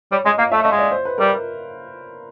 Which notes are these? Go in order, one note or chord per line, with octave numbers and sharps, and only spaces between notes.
G3 C#5
G#3 D#5
A#3 F5
A3 E5
A3 D#5
G#3
D5
C5
B4
G3 A#4